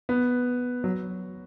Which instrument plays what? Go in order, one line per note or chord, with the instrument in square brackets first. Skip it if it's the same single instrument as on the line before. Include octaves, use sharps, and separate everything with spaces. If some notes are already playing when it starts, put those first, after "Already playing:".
[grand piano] B3
F#3